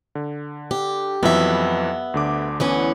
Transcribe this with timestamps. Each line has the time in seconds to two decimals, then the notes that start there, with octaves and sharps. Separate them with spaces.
0.15 D3
0.71 G4
1.23 F2 E3 F#3 B3 E5
2.14 D2 D3 D6
2.60 E3 B3 C#4